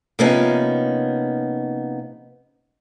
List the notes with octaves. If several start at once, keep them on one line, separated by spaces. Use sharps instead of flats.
C3 F3 A#3 B3 C#4 D#4